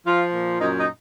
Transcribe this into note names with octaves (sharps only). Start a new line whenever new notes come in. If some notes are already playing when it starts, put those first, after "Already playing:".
F3 F4
A#2
F#2 D#4
D#4